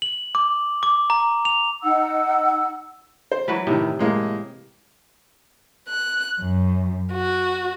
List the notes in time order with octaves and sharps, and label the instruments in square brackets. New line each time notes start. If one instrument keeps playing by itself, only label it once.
[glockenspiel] F#7
D6
D6
A#5
F7
[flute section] D#4 F#5 E6
[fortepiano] C5
[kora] E3 F#3 B4 [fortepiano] B5
[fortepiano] A2 D#3 [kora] C3
[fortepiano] A2 G#3 A#3
[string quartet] F#6
F#2
F#4